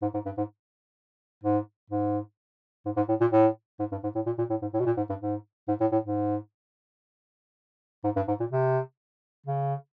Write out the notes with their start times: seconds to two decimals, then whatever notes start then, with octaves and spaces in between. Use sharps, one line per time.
0.02 G#2
0.14 G#2
0.25 G2
0.37 G#2
1.44 G#2
1.90 G#2
2.86 G#2
2.96 G#2
3.09 A2
3.20 A#2
3.32 A2
3.79 G#2
3.92 G2
4.03 G#2
4.15 A2
4.26 A#2
4.38 A#2
4.50 A2
4.62 G#2
4.74 A2
4.80 B2
4.86 A#2
4.97 G#2
5.09 G2
5.21 G#2
5.68 G#2
5.80 A2
5.92 A2
6.04 G#2
8.04 G#2
8.16 G2
8.28 G#2
8.40 A#2
8.51 C3
9.46 C#3